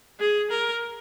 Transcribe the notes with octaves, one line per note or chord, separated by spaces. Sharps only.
G#4
A#4